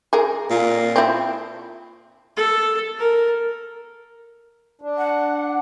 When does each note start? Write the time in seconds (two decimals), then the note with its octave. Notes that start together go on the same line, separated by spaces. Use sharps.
0.13 G#4 A#4
0.50 A#2
0.96 C4 E4
2.37 A4
2.99 A#4
4.81 D4
4.98 F#5